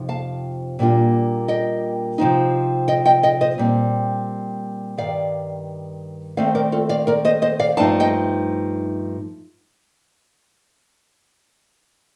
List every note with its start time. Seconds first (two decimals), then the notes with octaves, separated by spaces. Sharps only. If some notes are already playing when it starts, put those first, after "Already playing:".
Already playing: F2 C3 F3 D#4
0.09 F5 A5
0.79 A#2 G3 A#3 D4 F4
1.48 D#5 G5
2.18 C3 F3 C4 D#4
2.88 D#5 G5
3.06 D#5 G5
3.23 D#5 G5
3.41 C5 D#5
3.58 A#2 G3 C4
4.98 G2 D#3 G3 D5 F5
6.37 D#3 A3 C4 D5 F5
6.55 A#4 D5
6.72 F4 A4
6.89 D5 F5
7.07 A#4 D5
7.25 C5 D#5
7.42 C5 D#5
7.60 D5 F5
7.77 G2 F3 A3 D#4 F5 A5
8.00 D#5 G5